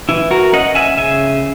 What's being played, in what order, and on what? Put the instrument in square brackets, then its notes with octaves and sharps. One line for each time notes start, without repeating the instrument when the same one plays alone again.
[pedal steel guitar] E3 E4
F#4 A#4
C#4 D#5 F#5
E5 G#5
C#3 E5 G#5